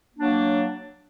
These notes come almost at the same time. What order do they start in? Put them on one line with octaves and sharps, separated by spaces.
A#3 D4 F#3